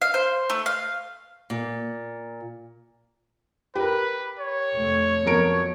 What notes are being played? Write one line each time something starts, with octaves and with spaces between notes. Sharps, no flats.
F5
C5
A3
F5
A#2
G4 A#4 B4
C#5
F1 A3
F2 F#3 B3 A#4 D7